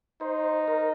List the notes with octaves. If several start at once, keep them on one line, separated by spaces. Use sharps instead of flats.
D#4 C5
A#4